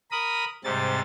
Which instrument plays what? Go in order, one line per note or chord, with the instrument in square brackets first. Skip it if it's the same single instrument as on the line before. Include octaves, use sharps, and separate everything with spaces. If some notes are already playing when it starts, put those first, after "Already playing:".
[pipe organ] A#4 B5 D#6
G#2 C3 G3 A6